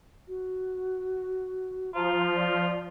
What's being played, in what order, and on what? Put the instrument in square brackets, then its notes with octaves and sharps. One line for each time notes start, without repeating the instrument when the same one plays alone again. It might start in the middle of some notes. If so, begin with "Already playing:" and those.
[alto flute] F#4
[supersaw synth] F3 [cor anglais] F4 [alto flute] A#5
[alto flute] D5